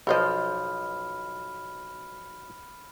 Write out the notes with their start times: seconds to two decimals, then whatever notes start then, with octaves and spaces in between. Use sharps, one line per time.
0.07 B1 F3 A4 C5 D#5 B5 F6